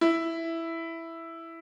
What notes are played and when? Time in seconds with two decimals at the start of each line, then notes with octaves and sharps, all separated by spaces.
0.01 E4